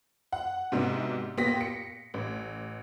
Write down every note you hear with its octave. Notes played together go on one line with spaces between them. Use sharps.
F#5
G#2 C3 B3 D4 F#4
A#2 B3 G4 A#6 B6
C#7
A1